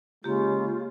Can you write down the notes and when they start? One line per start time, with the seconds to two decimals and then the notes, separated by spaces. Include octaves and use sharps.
0.24 C#3 G#3 A#3 F4 G4